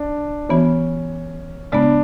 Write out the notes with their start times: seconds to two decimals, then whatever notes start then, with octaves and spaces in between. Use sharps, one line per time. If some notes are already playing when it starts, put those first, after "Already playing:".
Already playing: D4
0.49 E3 B3 C#4 F#4
1.72 C#3 G#3 B3 D4